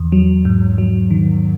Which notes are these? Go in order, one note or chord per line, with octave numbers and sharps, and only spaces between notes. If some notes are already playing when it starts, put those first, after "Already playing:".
Already playing: E2
F#3
G#2
F#3
D#3